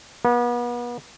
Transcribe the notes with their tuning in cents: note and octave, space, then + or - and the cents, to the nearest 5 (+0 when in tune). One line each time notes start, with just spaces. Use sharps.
B3 -35